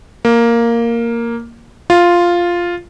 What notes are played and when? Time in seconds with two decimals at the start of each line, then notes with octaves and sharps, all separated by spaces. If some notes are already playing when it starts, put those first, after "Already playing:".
0.25 A#3
1.90 F4